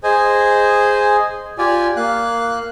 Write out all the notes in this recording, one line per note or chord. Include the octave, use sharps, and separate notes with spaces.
G#4 C5 D#5 G#5
F4 G4 D5 G#5
A#3 F5 F#6